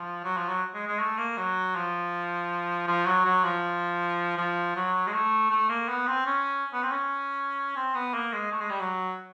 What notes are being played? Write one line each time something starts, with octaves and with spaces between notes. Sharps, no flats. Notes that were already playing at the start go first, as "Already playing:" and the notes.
Already playing: F3
F#3
F3
F#3
G#3
G#3
A3
A#3
F#3
F3
F3
F#3
F#3
F3
F3
F#3
G#3
A3
A3
A#3
B3
C4
C#4
B3
C4
C#4
C4
B3
A#3
G#3
A3
G#3
G3
F#3